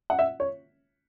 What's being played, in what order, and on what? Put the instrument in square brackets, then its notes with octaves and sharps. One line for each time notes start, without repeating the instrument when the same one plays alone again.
[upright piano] F#5
E5
C#5